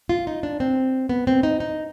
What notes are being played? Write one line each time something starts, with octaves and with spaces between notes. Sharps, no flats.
F4
D#4
D4
C4
B3
C4
D#4
D#4